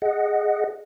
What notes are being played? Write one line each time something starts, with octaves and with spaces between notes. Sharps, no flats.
G#4 D#5 F#5